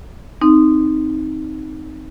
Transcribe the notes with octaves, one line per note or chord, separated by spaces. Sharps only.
C4 D#4